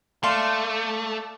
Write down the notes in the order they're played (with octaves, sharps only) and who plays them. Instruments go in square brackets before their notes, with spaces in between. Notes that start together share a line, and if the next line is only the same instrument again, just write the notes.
[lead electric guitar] A3 [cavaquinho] D5 F5 C6